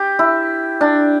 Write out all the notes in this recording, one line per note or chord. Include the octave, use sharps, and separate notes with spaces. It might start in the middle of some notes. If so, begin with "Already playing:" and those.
Already playing: G4
E4
D4